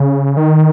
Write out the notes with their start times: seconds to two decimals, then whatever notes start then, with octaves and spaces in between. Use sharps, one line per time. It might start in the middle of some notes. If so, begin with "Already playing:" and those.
Already playing: C#3
0.37 D#3